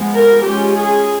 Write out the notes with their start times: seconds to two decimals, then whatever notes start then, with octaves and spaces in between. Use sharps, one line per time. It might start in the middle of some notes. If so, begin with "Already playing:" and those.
Already playing: F3 G#3 B3
0.15 A#4
0.45 G#3 C#4 F4 G4
0.76 G#4